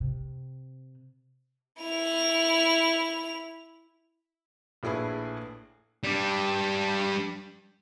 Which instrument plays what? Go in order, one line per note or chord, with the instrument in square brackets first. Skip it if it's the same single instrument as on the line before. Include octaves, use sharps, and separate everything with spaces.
[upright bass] C3
[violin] E4 F7
[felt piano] A#1 A2 E4 G#4 B4
[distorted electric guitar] G3 D4